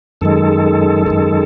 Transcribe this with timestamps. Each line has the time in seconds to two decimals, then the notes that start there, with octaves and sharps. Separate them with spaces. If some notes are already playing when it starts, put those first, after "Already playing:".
0.21 F#2 D#3 G#3 A4
1.06 F#2 D#3 G#3